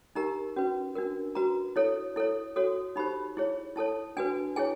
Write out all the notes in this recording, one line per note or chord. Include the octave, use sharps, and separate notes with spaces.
D#4 G4 A#4 A#5
C#4 F#4 B4
D4 F#4 A#4
F#4 B4 A#5
E4 A4 C#5
E4 A4 C#5
F#4 A4 C#5
D#4 G4 C5 B5
E4 G#4 C#5
E4 A4 C#5 A5
D4 F#4 B4 G#5
E4 G#4 C#5 G#5